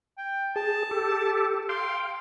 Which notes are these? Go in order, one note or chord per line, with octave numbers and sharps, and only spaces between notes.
G5
G#4 A5
G4 A4
F5 G5 C6